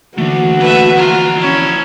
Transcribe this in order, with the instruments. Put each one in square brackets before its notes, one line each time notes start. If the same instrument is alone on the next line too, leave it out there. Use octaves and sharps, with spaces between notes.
[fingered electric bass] D3 E3 A#3 [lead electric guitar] A3 D4 [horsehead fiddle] F#4
[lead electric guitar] A3 [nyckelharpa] B4 E5
[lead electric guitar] F3 A#5 [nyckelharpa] F4
[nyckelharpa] C#4 E4